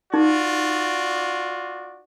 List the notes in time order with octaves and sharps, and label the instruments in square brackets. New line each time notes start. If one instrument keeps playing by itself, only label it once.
[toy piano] D#4 [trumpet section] F4 F#4 D5